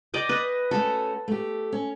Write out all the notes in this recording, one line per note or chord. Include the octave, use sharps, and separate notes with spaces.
D5 D#5 G5
B4 D#5
A3 C#4 F#4 A4
A3 G4
C#4